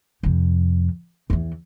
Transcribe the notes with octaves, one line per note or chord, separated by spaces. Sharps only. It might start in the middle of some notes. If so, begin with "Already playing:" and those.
F2 C3
E2 E3